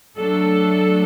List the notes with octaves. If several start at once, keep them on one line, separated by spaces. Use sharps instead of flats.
F#3 A3 D4 A4